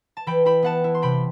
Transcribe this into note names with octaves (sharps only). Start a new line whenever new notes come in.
A5
E3 G5 B5
E4 G5 B5
B3 F#5 A5
E4
C6
C3 G5 B5